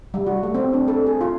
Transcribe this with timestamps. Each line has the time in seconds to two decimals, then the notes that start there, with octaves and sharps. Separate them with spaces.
0.14 G3
0.27 F#4
0.43 A3
0.55 C4
0.73 D4
0.88 A4
1.06 G#4
1.21 F4